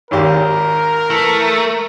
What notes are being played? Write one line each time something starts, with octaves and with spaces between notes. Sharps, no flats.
G#1 D#2 G4 A#4
E3 A3